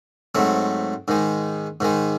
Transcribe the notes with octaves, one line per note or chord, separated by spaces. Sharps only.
G#2 F#3 A3 C4
G#2 D#3 G#3
G#2 D#3 G#3